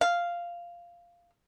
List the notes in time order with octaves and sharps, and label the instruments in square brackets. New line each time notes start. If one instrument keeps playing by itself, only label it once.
[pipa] F5